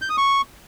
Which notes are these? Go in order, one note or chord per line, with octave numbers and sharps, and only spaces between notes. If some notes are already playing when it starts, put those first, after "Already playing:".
G6
D#6
C#6